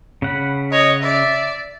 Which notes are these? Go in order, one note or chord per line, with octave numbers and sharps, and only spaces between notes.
C#3 F#5 B5
C#5 D#5
D5 E5